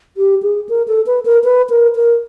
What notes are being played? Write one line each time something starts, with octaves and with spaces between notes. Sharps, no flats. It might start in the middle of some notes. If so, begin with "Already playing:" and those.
G4
G#4
A#4
A4
B4
A#4
B4
A#4
A#4